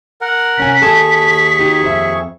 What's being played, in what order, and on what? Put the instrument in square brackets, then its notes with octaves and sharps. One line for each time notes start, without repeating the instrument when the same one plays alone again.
[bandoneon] A#4 F#5
[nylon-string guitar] C3 C#4 G#5 [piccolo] B6
[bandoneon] D#2 G#4 C#6 [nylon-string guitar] A4 G#5 A5
[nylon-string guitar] D#4 F#4 G4
F2 C5 E5